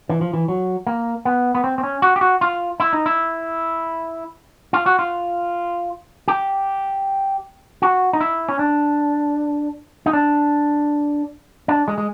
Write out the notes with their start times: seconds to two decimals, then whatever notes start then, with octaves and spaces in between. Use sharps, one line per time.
0.09 E3
0.21 F3
0.34 E3
0.48 F#3
0.87 A#3
1.25 B3
1.55 B3
1.64 C4
1.78 C4
1.83 C#4
2.02 F#4
2.16 G4
2.21 F#4
2.41 F4
2.80 E4
2.93 D#4
3.06 E4
4.73 F4
4.86 F#4
4.99 F4
6.28 G4
7.82 F#4
8.13 D#4
8.21 E4
8.49 C#4
8.59 D4
10.06 D#4
10.13 D4
11.68 D4
11.88 G#3
11.98 G#3